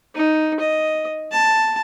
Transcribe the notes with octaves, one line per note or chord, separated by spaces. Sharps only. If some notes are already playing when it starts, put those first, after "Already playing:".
D#4
D#5
A5